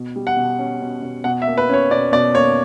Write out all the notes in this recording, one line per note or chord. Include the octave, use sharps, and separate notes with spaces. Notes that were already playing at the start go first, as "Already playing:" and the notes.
Already playing: B2
G3
F#5
B2
C#4
B2
B2
B2 F#5
E5
A#3
B4
C#4 C#5
B2 D5
B2 D5
A#3 C#5